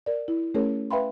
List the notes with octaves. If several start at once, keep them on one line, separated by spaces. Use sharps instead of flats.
A#4 D5
E4
A3 C#4 G#4 A#4 C#5
B4 E5 F5 G5 B5 C6